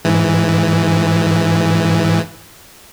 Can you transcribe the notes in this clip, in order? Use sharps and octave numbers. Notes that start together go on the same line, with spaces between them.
G#2 E3